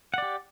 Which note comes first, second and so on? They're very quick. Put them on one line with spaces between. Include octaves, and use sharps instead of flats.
F#5 D5 G4